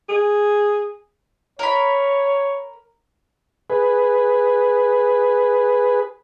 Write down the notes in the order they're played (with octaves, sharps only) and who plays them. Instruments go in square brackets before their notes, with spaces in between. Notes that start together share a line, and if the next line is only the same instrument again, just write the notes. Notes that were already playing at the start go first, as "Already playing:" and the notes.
[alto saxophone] G#4
[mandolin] A#4 B5 [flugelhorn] C#5
[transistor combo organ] G#4 B4